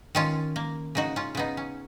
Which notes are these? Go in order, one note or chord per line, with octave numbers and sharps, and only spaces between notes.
D#3 C#4 F4
A#3
C#3 D#4 F#4
C#4 F4
C#3 B3 D#4
C#4